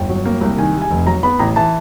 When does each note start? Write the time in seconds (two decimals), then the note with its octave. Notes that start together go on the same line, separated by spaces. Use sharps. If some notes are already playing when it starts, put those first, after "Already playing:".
Already playing: G1 G5
0.09 F#3
0.25 A#3
0.41 C2
0.58 D#3 G#5
0.74 G3
0.82 G#5
0.90 F1
1.07 F#3 A#5
1.23 B3 B5
1.39 A1 A#5
1.56 E3 A5